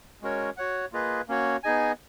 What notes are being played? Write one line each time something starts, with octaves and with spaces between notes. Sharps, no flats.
G#3 C#4 F#4 A#4 C#5
F#4 C#5 F#5
A#3 F4 G#4 B4 D#5
A#3 C#4 F#4 C#5
B3 D#4 G#4 D#5 G#5